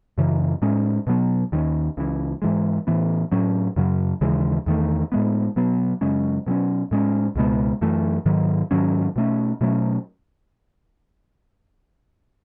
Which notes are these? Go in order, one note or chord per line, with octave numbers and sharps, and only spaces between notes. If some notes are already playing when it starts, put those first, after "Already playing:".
F#2 C#3 E3
A2 G#3 C#4
B2 F#3 B3
D#2 D#3 A3 C#4
C#2 C#3 E3
G#2 E3 G#3
A2 E3 B3
A2 F#3 C#4
F#2 C#3 F#3
D#2 C#3 E3 G#3
E2 D#3 A3
A2 G#3 B3
B2 F#3 B3
F#2 C#3 G#3 C#4
B2 F#3 C#4
A2 G#3 C#4
C#2 B2 G#3 B3
F#2 E3 A3
G#2 D#3 F#3
G#2 D#3 F#3 C#4
B2 A3 C#4
B2 F#3 A3 C#4